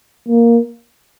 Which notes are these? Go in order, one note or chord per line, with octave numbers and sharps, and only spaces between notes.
A#3